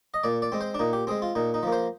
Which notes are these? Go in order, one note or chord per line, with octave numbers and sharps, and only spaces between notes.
D#5
A#2 D5
D5
G#3 C4
C5
D4
A#2 D#4
G4
G#3 C4 G#4
F4
A#2 D#4
D#4
F3 A#3
C5